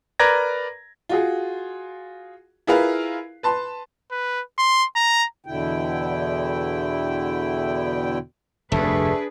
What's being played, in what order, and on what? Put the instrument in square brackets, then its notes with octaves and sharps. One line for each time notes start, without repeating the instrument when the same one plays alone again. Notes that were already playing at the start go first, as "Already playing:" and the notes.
[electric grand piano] A#4 B4 D5 A#5 G#6 A#6
[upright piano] F4 F#4 G#4
E4 F4 G#4 A#4 B4 F5
B4 A5 C6
[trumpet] B4
C6
A#5
[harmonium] E2 B2 D3 E4 G5
[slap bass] F1 D2 G2 [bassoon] A3 [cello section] D4 G#4 B4